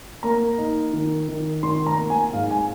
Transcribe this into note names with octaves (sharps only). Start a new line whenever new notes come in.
A#3 A#5
D#4
D#3
D#3
D#3 C6
A#5
A#3
G#5
G#2 F5
G#5